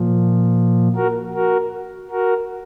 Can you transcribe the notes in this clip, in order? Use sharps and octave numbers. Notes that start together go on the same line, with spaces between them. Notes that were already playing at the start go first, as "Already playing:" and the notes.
Already playing: A#2 F3
F#4 A#4
F#4 A#4
F#4 A#4